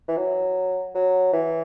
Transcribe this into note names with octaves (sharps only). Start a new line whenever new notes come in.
E3
F#3
F#3
E3